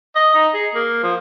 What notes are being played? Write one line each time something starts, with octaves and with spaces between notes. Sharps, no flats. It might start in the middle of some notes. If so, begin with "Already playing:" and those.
D#5
D#4
G#4
A#3
F3